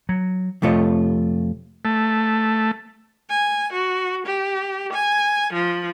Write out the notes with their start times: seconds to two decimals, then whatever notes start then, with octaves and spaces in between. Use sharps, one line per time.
0.09 F#3
0.62 F2 C3 A3 F4 C#5 D#5
1.85 A3
3.30 G#5
3.73 F#4
4.26 G4
4.93 G#5
5.53 F3